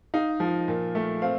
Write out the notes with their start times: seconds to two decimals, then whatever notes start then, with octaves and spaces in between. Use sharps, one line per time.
0.14 D#4 F5
0.40 F3
0.68 A#2
0.95 A3
1.22 C4 F5